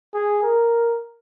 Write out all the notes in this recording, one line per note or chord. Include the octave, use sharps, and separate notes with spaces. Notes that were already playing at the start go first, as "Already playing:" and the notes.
G#4
A#4